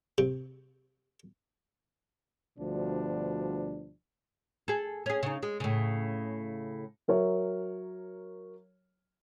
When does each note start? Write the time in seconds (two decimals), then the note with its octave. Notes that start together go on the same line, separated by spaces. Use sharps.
0.18 C3
2.59 D2 B2 F3 G3 D4
4.68 G#4 A4
5.06 C#4 G#4
5.23 C#3 D#4
5.43 G#3
5.60 A2 C#3
7.08 F#3 A#4 C#5 E5